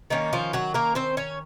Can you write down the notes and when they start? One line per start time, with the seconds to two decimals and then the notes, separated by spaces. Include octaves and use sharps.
0.10 D#3 A#3 C#4 D#4
0.33 F3 F4
0.53 F#3 F#4
0.74 A#3 A#4
0.95 C4 C5
1.17 C#4 C#5